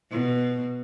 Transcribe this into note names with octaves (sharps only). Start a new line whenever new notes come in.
B2